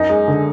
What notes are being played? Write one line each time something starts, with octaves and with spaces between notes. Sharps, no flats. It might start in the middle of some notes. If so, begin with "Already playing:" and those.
Already playing: F#2 D#4
G#3
D3